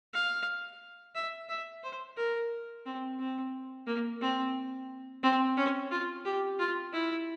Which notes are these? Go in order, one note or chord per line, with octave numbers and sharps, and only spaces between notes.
F5
E5
E5
C5
A#4
C4
C4
A#3
C4
C4
C#4
F4
G4
F4
E4